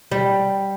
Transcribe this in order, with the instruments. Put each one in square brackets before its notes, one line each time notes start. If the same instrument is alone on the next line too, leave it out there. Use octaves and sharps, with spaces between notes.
[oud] G3